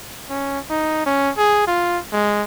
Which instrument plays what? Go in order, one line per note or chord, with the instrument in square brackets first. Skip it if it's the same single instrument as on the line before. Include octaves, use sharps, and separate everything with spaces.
[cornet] C#4
D#4
C#4
G#4
F4
G#3